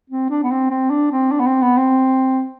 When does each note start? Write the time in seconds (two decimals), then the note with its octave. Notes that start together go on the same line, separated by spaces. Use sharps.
0.10 C4
0.30 D4
0.43 B3
0.51 C4
0.70 C4
0.90 D4
1.11 C4
1.31 D4
1.39 B3
1.46 C4
1.62 B3
1.77 C4